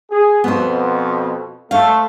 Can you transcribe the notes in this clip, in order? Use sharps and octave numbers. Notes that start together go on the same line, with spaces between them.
G#4
F2 B2 B3 C5
A3 C5 F5